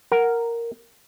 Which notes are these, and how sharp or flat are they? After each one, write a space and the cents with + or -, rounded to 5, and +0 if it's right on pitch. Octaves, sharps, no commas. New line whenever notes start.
A#4 +0 F#5 +0